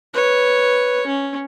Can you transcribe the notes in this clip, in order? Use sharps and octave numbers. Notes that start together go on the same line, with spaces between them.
B4 C#5
C#4